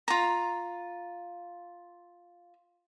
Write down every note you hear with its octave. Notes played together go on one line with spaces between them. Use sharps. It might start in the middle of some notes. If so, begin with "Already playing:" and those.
F4 A#5